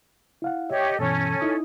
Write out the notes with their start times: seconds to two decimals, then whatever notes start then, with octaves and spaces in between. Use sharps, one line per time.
0.42 E4 F5 F#5
0.70 G4 C#5 D#5 E5
0.99 G2 B2 E3 C#4 A4
1.41 D#4 E4 D#6